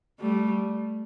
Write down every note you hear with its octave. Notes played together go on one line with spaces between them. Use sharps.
G3 A3